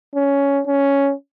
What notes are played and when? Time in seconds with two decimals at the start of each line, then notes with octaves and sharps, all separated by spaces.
0.16 C#4
0.67 C#4